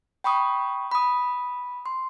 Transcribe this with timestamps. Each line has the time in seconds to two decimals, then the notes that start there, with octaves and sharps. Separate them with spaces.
0.24 G5 B5 C#6 D#6
0.91 B5 D#6
1.86 C6